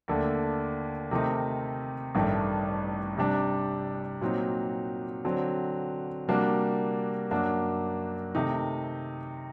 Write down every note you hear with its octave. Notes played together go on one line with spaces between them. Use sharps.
D#2 D3 A3
C3 D#3 A3 C4 D#4
A1 G2 D#3 A3
C3 G3 D4
A#2 F#3 C4 D#4
D3 F#3 C4
C3 G3 A#3 D4 F#4
F#2 F#3 A#3 D4 F#4
C3 D#3 A3 D#4